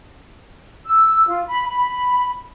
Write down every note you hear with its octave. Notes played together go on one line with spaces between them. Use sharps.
E6
F4
B5
B5